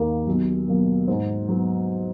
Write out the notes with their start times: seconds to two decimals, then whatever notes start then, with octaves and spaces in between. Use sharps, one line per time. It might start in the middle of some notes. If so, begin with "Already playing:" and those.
Already playing: D#2 D#3 A#3
0.27 B1
0.68 B2 F#3 A#3
1.08 G#2
1.48 F#3 B3